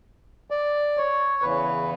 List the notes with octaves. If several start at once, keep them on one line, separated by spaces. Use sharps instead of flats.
D5
C#5
E2 C#3 E3 B4